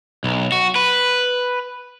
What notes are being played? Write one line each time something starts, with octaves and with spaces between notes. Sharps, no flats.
B1
F#4
B4